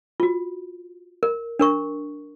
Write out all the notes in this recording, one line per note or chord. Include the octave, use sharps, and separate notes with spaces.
F4 F#4
A#4
D4 A#4 C#6